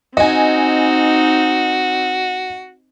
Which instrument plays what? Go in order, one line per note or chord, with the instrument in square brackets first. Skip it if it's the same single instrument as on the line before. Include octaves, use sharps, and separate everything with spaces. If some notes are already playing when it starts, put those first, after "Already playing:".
[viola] C4 D#4 [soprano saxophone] F#4 [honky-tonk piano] D#5 G#5